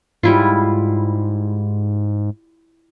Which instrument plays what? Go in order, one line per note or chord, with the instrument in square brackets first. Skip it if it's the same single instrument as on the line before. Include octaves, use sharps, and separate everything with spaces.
[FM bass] G#2 [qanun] G3 E4 F4